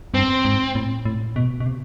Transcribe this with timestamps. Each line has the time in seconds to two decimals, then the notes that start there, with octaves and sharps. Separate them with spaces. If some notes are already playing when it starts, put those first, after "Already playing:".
0.14 G2 C4
0.45 G#2
0.75 A2
1.05 A2
1.36 B2
1.60 B2
1.66 C3